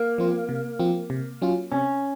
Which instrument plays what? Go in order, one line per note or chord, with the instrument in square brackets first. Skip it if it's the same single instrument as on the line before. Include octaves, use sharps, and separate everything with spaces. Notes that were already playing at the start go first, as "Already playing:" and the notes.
Already playing: [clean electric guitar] A#3
[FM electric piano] F3 C4 F4
C3
F3 C4 F4
C3
F#3 C#4 F4
[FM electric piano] C3 [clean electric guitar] C#4